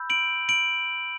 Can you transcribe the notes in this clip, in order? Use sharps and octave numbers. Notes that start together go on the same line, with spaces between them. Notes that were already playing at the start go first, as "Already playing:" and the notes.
Already playing: B5 E6 G6
D7 F#7
D7 F#7